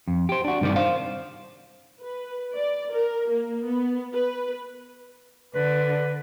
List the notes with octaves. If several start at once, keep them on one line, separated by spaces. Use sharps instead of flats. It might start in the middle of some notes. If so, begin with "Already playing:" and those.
F2
G4 C5
D4 F#4
G2 C3 D#3 G3 D5
C5 F5
B4
D5
A#4
A#3
B3
B4
D3 B4